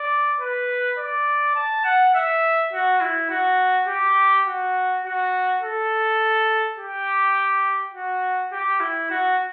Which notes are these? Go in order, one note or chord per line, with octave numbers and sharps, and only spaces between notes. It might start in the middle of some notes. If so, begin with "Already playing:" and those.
Already playing: D5
B4
D5
A5
F#5
E5
F#4
E4
F#4
G4
F#4
F#4
A4
G4
F#4
G4
E4
F#4